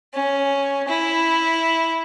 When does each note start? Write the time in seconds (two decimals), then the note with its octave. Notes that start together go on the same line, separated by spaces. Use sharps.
0.14 C#4
0.88 E4